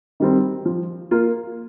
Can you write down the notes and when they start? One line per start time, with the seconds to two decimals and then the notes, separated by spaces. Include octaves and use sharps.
0.20 D#3 G3 C4
0.65 F3
1.11 A#3 F4